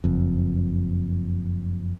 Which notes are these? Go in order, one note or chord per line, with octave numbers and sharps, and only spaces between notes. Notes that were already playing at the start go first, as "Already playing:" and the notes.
F#1 F2